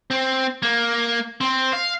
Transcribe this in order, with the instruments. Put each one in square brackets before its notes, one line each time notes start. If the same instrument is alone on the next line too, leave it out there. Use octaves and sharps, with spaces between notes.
[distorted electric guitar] C4
A#3
C4
F5